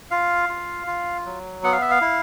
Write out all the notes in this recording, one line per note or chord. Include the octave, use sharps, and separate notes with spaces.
F4 F5
F4
F4
F#3
B3 F#5
F5
E5
F5
E4